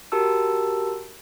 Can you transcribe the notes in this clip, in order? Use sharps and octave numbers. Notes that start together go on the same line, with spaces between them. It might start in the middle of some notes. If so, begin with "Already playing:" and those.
F#4 G4 A#4 A5 E6